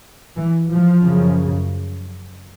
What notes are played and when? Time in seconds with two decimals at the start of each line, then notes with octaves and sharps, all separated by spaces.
0.36 E3
0.70 F3
1.04 F#2 C#3